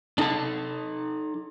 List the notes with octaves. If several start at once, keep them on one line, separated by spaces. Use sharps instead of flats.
D4 D#4 A4 A5